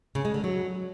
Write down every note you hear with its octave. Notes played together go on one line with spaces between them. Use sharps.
C#3
G#3
D3
F#3